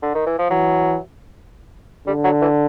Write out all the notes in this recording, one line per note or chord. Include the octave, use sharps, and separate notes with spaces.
D3
D#3
E3
F3
E3 F#3
D3 G3
F#3
E3